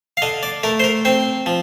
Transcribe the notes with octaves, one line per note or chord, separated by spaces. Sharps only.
F5
D3 D#5
D5
A3 A#4
C5
A#4
C4 C5
F3